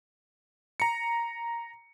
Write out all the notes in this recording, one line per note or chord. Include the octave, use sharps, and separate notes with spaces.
A#5 C#7